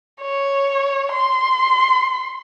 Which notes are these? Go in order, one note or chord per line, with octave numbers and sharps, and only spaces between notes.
C#5
C6